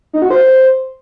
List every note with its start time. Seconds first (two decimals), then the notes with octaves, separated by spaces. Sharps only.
0.13 D#4
0.22 F#4
0.30 C5